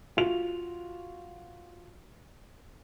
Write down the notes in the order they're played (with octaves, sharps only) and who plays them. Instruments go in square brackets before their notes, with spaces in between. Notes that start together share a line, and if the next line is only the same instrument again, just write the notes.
[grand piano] F4 F#4 F7